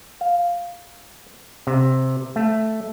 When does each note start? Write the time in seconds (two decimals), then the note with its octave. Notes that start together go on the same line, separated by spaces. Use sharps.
0.21 F5
1.67 C3
2.36 A3